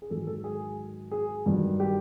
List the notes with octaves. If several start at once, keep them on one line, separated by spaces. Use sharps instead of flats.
G#4
G#2 D#3 F#3 A4
A4
G#4
G#4
G2 D#3 F#3
G4